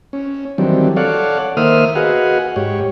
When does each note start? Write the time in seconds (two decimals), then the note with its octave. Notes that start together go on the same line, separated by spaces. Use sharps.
0.13 C#4
0.58 D#3 E3 F#3 G3 C4 D4
0.97 A4 C#5 D5 F5 F#5
1.57 D#3 A#3 C5 E5 D#6 F6
1.95 F#4 G#4 B4 D#5 F5 F#5
2.56 G#2 G4 C#5